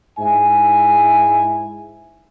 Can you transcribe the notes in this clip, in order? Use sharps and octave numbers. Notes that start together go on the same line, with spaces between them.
G#2 E4 E5 G#5